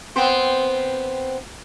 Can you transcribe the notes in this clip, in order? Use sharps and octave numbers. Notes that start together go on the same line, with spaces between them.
B3 C4 C5